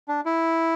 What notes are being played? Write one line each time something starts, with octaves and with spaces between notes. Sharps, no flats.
D4
E4